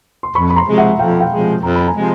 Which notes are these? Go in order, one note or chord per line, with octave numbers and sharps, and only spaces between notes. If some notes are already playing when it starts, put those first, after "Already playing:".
C6
F2 B5 C#6
B5
A#5 C6
C3 F3 G#3
E5 F#5
F2 F5 G5
F5 G5
C3 F3 G#3
F2 A#5
B5
G#5 A#5
C3 F3 G#3